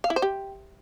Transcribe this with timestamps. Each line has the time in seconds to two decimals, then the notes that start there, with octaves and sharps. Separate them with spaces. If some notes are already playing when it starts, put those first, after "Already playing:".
0.04 F5
0.10 E4
0.16 C5
0.22 G4